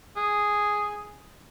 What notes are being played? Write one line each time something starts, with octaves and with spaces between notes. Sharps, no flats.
G#4